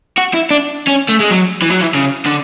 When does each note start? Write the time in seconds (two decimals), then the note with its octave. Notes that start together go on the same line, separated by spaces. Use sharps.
0.18 F#4
0.34 E4
0.51 D4
0.87 C#4
1.09 A3
1.20 G#3
1.30 F#3
1.62 E3
1.71 F#3
1.80 E3
1.94 C#3
2.26 D3